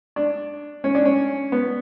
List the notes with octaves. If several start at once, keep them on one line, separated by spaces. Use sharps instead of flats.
D4
C#4
D4
C#4
B3